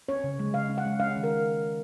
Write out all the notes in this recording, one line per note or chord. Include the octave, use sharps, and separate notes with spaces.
C#4 C#5
C#3
G#3
C#3 F5
C#4
F#5
G#3
C#4 F5
D#3
A#4